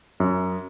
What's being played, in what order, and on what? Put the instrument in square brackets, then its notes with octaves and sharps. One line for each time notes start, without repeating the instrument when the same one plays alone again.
[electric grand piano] F#2